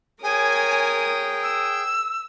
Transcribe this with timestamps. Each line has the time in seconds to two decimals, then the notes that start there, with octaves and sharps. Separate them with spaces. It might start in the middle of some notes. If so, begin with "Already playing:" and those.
0.23 G#4 A#4 C#5 G5 G#5 D#6
1.43 E6